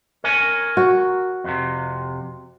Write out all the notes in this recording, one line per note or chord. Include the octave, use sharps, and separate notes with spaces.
A#4 C#5 G#5
F#4
F2 C3